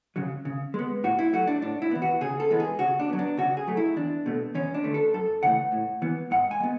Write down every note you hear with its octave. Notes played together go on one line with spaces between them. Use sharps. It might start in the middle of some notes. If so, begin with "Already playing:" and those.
C#3 F#3
C#3
G#3 B3
A2 F#4
E4
F#3 A3 F#4
D4
A2 D4
E4
E3 B3
F#4
C#3 G#4
A4
E3 G#3 B3
G#4
C#3 F#4
D4
F#3 B3
D4
C#3 F#4
G#4
F#3 A3
E4
E2 D4
B2 A3
E2 C#4
D4
D3 A3
A4
F#2 A4
C#3 E3 A3 F#5
A2
E3 B3
G#2 F#5
G#5
G#3 B3